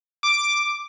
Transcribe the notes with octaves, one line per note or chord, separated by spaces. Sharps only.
D6